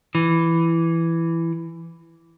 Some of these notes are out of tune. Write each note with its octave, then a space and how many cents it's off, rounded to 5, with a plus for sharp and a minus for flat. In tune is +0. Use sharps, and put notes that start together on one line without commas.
E3 +10